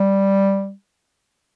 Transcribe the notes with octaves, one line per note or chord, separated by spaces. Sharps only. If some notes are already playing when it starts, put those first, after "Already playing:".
Already playing: G3